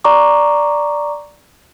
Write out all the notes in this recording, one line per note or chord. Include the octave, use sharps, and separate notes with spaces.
D5 A#5 C#6 D6